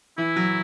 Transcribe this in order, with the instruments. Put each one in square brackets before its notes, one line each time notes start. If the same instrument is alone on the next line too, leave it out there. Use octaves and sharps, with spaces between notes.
[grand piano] E3 [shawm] E4
[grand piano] F#3